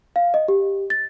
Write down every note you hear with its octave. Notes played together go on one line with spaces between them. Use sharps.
F5
D#5
G4
A6